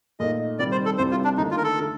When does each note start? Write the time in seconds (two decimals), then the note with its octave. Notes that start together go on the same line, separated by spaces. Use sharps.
0.20 A#2 A3 D#4 D#5
0.59 C3 D#3 G3 D5
0.72 C5
0.85 A4
0.98 C2 C3 G3 C5
1.11 F4
1.24 D4
1.37 D#2 D3 A3 D#4
1.51 F4
1.57 A#4
1.64 A4
1.79 D3 A3